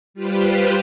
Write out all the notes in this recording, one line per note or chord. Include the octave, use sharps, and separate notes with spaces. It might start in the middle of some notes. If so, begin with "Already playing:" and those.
G3 F4 G4 B4 C5